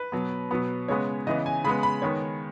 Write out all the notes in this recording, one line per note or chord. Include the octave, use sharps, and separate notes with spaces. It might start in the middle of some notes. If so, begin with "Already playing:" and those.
Already playing: B4
B2 F#3 B3
B2 F#3 B3
C#3 G#3 B3 C#5
C#3 E3 B3 D#5
G#5
C#3 G#3 B3 B5
B5
D#3 G#3 B3 C#5